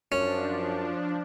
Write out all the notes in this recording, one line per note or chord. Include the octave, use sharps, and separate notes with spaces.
F#2 F3 C#4 D4